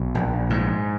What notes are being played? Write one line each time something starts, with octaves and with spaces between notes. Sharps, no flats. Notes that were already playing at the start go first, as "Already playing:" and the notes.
Already playing: B1
A#1
G#2